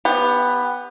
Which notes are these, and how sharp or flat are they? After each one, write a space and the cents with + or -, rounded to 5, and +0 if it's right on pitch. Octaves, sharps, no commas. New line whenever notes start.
B3 +0 G4 +20